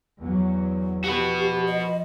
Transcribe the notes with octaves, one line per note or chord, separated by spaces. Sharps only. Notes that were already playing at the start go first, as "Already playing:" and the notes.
E2 F#3
F3 F#4 G4 B4
D#5